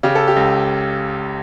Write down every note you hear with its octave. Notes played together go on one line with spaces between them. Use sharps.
C#3 G4
A4
G4
C#2